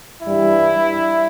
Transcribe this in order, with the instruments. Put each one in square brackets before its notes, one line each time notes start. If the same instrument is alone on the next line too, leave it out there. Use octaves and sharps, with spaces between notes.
[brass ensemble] G2 E3 G3 E4